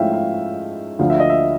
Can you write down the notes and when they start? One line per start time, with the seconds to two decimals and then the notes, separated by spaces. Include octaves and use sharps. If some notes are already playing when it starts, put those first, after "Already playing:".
Already playing: G#2 F3 A3 C#4 E4 E5 F5 G5
0.13 F5
0.99 D2 D3 F3 F5
1.10 E5
1.20 D#5
1.30 E5